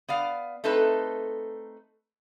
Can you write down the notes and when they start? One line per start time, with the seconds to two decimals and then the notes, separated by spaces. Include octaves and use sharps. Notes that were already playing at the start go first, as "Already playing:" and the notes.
0.09 B3 D5 F5
0.64 A3 C4 D#4 A4 B4